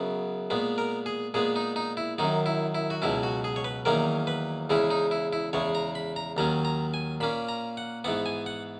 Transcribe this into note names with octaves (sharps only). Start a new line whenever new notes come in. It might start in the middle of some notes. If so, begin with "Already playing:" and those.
Already playing: F#2 C#3 F#3 B3
A#2 G#3 B3
A#4
G#4
A#2 G#3 B3 G#4
D#4
D#4
E4
F#2 D#3 F#3 D#4
E4
E4
F#4
C#2 B2 F#3 C#4 E4
F#4
G#4
C#5
B4
E2 D#3 F#3 A#3 C#4 A#4
B4
E2 C#3 G#3 C#4 E4
D#4
E4
E4
E2 C#3 G#3 C#5
A#5
B5
A#5
D#2 D#3 F#3 C#4 A#5
A#5
G#5
A#2 A#3 C#4 B5
A#5
F#5
G#2 E3 B3 F#5
G#5
F#5